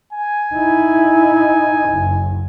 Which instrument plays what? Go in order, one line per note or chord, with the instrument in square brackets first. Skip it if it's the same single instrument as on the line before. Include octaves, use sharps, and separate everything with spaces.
[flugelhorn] G#5
[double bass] D#4 E4
F#1